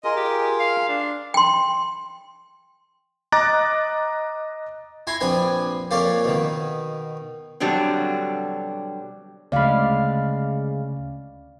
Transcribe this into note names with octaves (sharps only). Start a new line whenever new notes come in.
F4 G#4 A#4 D#5
G4
F5
D4
G5 C6
D#5 A#5 D6 F#6 A6
E4 G#5 A#5 C6
A#1 C4 D4 B4 G#5
F2 A#2 A#3 C#4 D5 F5
B2 D#3
B2 D3 F#3 G3 C4 D4
D2 C#3 G#3 D5 F5 B5